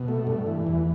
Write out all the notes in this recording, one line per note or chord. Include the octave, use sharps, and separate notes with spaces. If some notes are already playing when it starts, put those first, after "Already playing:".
Already playing: B2
A3
G2
E3
E2